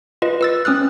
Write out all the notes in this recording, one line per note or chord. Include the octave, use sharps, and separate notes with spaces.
F4 B4 D#5
B4 E6 A6
C4 C#4 D#6 F6 F#6